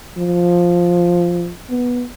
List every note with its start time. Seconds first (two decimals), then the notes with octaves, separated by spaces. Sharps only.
0.18 F3
1.70 B3